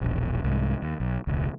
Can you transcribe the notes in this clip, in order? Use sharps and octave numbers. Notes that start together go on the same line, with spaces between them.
E1 A#1
C2 G#2
D#2
B1
E1 C#2